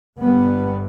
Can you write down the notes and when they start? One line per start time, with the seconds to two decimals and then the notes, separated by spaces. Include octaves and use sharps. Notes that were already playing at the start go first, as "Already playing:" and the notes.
0.20 G1 G2 G3 B3